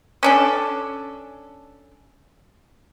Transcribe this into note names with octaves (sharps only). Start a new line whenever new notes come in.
C#4 D4 A4